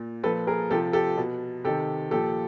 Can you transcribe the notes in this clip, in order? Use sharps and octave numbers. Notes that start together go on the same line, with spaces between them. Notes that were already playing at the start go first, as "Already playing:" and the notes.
Already playing: A#2
A#2 F3 A4 B4
G#4 A#4
C3 F3 G4 A4
G4 A4
B2
C3 D#3 G4 A4
A#2 F3 G4 A4